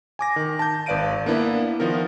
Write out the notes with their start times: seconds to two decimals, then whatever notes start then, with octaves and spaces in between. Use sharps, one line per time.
0.19 G#5 D6 A#6
0.36 D#3
0.59 A5 G6
0.86 G#1 B4 D5 F5 D7 D#7
1.26 A#3 B3 D4 E4 B4
1.80 D#3 F3 B3 A#4